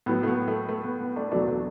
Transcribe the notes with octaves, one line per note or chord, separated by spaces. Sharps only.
A2 F#3 B3
A3
B3
A3
A3
B3
B3
A3 D4
E2 B2 F#3 A3 D4
A3 D4